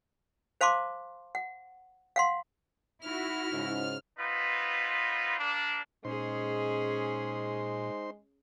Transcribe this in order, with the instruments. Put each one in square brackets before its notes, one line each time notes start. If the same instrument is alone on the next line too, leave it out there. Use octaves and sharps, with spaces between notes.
[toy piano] C5 F5 A5 C6 D6
F#5
F5 F#5 C6
[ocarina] D#4 [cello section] E4 F#4 [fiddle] F6
[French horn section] G#2 C#3
[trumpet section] B3 C4 D#4 F4 B4
A#3 D4
[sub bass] A#2 [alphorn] G#3 [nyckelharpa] C#4 G#4 [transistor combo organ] D#4 C5 C6